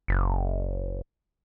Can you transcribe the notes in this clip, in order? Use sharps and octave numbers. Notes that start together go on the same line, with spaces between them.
F#1